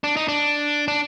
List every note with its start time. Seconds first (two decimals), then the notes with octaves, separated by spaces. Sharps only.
0.04 D4
0.17 D#4
0.28 D4
0.88 D4